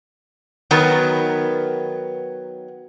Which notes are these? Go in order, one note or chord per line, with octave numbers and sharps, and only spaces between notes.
D#3 F#3 B3 A#4 B4